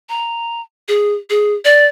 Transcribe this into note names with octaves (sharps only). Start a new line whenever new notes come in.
A#5
G#4
G#4
D5